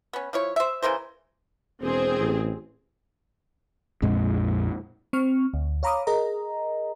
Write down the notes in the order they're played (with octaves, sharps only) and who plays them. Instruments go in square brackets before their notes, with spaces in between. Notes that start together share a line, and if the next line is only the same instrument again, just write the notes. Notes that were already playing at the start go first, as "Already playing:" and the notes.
[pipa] B3 C#4
F3 E4 C#5
C5 E5
C#3 E3 A#4 C5
[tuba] E1 [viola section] C4 G#4
[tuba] A1
[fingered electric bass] A#1 F2 A#2 G#3
[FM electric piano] C4 C#6 F6
D2
C#5 F5 A#5 B5 D6 D#6
G#4 A#4 D#5 A#5